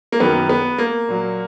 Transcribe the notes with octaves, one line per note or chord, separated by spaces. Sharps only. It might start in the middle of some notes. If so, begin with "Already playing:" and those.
A#3
F#2 D#3 F#3 B3
B3
A#3
A#2 F#3